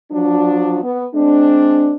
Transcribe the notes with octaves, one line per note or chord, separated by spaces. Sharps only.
F3 F#3 D4
B3
G#3 C4 D4